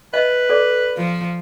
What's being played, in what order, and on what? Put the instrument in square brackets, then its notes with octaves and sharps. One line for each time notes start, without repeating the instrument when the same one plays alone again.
[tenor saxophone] B4 [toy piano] D#5 E5
[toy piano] A4 D5 D6
[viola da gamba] F3